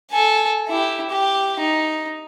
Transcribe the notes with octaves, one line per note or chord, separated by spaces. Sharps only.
A4 G#5
E4 G4
G4
D#4